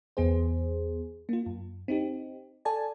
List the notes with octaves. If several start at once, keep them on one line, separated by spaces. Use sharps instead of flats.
E2 B3 G#4 C5
A#3 F4
F#2
C4 D#4 G4
A4 D5 G#5 A5